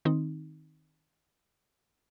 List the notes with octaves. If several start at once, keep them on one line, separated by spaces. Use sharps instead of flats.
D#3 C4 D#4